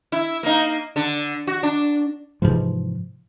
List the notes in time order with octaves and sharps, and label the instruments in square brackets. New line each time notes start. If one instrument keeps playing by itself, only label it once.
[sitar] E4
A#3 D#4
D3
F#4
D4
[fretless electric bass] G#2 C3 E3 F3